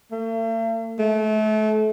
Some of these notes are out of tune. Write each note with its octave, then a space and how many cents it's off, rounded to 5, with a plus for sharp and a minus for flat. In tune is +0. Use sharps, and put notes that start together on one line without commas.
A3 +45
A3 -30